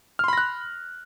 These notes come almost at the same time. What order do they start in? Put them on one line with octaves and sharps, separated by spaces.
F6 C6 B5 A#6 F#6